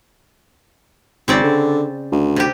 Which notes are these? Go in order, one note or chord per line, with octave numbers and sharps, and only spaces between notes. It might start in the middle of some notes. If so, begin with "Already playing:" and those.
G#1 C#3 C4 D5
D3
D2
C3 G4